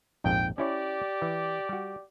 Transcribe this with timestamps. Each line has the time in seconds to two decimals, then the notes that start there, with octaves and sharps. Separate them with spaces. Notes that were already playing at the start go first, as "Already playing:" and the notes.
0.24 A#1 F2 G#2 G5
0.58 C#4 E4 G4 C#5 D5
1.22 E3
1.69 G3 F#4